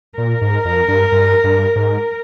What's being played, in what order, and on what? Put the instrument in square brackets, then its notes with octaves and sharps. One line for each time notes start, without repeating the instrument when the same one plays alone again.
[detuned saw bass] A#2 [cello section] A#4
[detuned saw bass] G#2
F2
G2
G2
G2
G#2